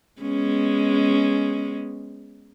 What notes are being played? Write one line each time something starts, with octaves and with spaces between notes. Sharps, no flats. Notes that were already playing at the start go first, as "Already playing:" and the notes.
G#3 B3 C#4